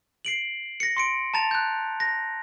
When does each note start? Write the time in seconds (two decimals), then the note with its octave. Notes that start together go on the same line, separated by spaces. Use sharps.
0.25 C7 D7 F#7
0.80 A#6 C#7
0.97 C6 C#7 D7
1.34 A5 A#5 A6 F7
1.51 F#6 G6
2.00 A#6